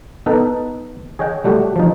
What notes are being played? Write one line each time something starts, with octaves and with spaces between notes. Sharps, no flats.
B3 D#4 A4 B4
G#4 C#5 D#5 F#5 G5
G3 A3 F#4 G4
F3 D#4